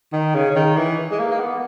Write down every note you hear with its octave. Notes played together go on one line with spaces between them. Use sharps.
D#3
C#3
C#3
D#3
E3
G#3
A#3
A#3
B3